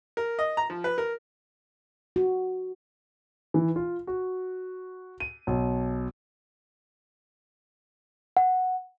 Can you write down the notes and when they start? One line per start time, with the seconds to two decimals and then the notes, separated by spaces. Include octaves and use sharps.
0.17 A#4
0.39 D#5
0.57 A#5
0.70 F3
0.84 B4
0.98 A#4
2.16 F#4
3.54 E3
3.76 F4
4.07 F#4
5.20 D#7
5.47 B1
8.37 F#5